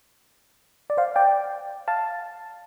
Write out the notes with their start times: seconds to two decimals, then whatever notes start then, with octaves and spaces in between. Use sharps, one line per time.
0.90 D5
0.97 C5 F5
1.16 D5 G5
1.88 F5 A5